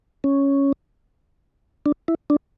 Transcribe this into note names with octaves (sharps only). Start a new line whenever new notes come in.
C#4
D4
E4
D4